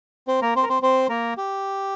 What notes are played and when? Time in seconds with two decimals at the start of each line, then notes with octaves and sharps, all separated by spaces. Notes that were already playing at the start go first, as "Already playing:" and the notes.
0.28 C4 C5
0.42 A#3 A#4
0.56 C4 C5
0.63 A#4
0.69 C4 C5
0.82 C4 C5
1.09 A#3 A#4
1.37 G4